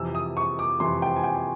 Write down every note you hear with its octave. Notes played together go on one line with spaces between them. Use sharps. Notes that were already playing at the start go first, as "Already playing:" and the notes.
Already playing: F2 C3 E3 E6
D#6
C#6
D6
F2 C3 E3 C6
G5
G#5
G5
G#5